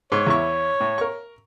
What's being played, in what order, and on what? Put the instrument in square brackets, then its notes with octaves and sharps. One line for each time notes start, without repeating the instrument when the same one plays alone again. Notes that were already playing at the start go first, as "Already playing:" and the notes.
[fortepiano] G#2 [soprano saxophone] C#5
[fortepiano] E2 E4 C#6
A2
A#4 C#6